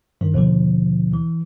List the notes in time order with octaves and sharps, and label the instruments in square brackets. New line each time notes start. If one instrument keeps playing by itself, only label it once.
[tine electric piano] G2 D#3
D#2 B2 D3 F3
E3